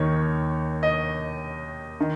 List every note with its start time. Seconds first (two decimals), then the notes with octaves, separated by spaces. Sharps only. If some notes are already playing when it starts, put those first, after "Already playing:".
Already playing: D#2 D#3 C#5
0.83 D#5
2.00 D#3